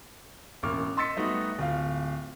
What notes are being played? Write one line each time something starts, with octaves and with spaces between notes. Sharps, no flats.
E1 A1 A#3 C#6 D6 F6
D#5 C6 E6 A6 B6 C#7
G3 A3 B3 D#4 F#4
D1 F4 F5